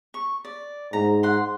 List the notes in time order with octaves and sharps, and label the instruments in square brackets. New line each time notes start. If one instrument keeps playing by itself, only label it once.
[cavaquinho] C#6
D5
[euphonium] G#2 [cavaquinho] A#5
[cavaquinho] F#5 C6